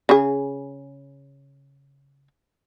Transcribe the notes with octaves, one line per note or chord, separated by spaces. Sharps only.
C#3 G#4